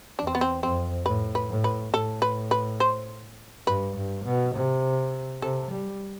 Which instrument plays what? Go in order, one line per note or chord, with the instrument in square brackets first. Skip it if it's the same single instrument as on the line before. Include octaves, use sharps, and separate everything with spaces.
[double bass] E2 [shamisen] D4
[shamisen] C4
B3
C4
[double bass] F2 [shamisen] C4
[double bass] A2 [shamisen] B4
[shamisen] B4
[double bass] A2
[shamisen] B4
[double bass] A2 [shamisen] A4
[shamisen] B4
B4
C5
[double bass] G2 [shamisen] B4
[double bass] G2
B2
C3
[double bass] C3 [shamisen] A4
[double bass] G3